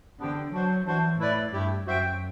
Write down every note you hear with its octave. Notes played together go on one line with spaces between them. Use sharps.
D3 B3 D4 G4 C5 G5
F#3 D4 F#4 C5
E3 D4 F#4 C5
A2 E4 B4 D5
G2 A3 E4 G4
F#2 F#4 C5 E5 G5